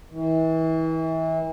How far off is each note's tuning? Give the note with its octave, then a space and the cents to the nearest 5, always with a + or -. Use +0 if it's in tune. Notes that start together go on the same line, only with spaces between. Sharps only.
E3 -30